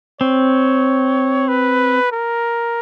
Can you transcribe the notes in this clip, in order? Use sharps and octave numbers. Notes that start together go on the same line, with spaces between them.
C4 C#5
B4
A#4